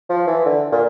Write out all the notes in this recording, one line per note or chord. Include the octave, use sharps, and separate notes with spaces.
F3
E3
D3
A#2